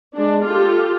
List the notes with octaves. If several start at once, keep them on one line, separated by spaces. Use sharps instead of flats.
G#3 D4
F4 G4 A4